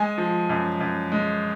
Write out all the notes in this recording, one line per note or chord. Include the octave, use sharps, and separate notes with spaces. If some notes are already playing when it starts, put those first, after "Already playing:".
Already playing: G#3 G#5
F3
F#2
F#2
G#3